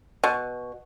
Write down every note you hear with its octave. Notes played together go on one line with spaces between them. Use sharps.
B2